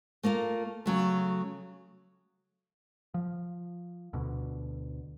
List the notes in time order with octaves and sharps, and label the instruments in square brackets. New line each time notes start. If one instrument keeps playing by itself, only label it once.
[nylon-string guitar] A3 A#3 F4 A#4
C#3 F#3 A3
[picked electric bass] F3
D2 B2 D3